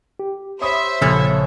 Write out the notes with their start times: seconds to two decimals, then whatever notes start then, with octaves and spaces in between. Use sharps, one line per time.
0.19 G4
0.61 C5 C#5 E5 B5 D#6
1.02 A#1 C#3 F3 A4 C#5 B5